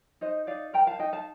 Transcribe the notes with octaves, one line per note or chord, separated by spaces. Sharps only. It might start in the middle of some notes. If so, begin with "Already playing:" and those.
D#4 C5 D#5
D#4 D5 F5
A#4 G5 A#5
F5 A5
D#4 D#5 G5
F5 A5